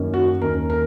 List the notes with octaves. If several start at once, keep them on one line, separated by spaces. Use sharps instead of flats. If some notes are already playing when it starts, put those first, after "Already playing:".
Already playing: F#2 D#3 A#3 C#4
F#4
D#2 D#3 A#3 C#4 A#4
A#4